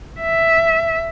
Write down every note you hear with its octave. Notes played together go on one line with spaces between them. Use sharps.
E5